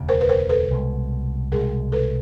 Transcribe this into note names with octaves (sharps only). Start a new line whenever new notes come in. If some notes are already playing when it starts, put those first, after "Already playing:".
Already playing: E1 D2 C#3
A#4 C5
B4
A#4 C5
A4 B4
C2 B2 G#3
C2 B2 G#3 G#4 A#4
A4 B4